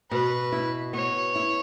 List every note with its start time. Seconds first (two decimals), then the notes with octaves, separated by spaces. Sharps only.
0.11 B2 B4
0.52 E4
0.93 B3 C#5
1.36 E4